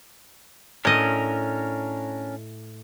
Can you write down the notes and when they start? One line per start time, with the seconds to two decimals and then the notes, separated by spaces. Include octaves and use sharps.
0.85 A2 C#4 D4 A#4 D#5